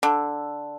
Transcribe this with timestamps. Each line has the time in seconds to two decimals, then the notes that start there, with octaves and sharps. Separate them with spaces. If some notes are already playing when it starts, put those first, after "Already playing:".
0.03 D3